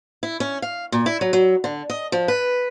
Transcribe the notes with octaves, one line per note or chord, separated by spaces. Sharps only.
E4
C#4
F5
A#2
E4
F#3
F#3
D3
D#5
F3
B4